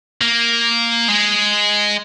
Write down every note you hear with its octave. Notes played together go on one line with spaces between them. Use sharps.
A#3
G#3